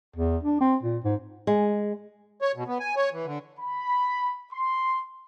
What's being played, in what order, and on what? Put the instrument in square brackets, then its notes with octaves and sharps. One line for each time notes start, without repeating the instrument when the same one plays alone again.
[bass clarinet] E2
D4
C4
A#2
G#2
[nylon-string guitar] G#3
[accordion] C#5
B2
B3
G#5
C#5
E3
D3
[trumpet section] B5
C6